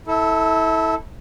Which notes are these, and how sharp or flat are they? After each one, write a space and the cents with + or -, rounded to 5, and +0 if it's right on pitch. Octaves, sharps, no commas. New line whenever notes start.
E4 -25 A4 +0